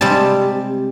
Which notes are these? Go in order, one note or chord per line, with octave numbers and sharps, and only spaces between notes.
C3 G3 G#3 C4 A5